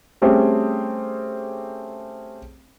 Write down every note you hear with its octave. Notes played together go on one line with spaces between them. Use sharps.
G3 A3 C4 C#4 G4 G#4